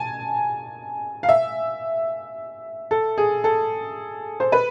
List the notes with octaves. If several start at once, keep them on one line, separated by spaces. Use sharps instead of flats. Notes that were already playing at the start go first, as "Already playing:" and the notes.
Already playing: G#5 A5
F5
E5
A4
G#4
A4
C5
B4